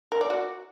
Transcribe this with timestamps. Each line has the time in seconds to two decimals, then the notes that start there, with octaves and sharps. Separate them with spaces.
0.12 A#4
0.21 D5
0.30 F#4